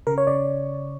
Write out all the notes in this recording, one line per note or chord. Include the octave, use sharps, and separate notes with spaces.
C#3 A#4
C#5
C#3 D5